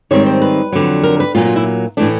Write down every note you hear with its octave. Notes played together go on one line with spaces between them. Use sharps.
G#2 D#3 G3 C4 C#5
C5
B4
F2 D3 F#3
A#4
B4
A#2 F#3 A#3 F4
F4
E4
A2 E3 A3 D4